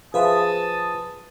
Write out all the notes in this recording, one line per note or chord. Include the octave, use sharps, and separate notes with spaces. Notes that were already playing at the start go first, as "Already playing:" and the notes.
F3 G#4 B4 E5 A5 D#6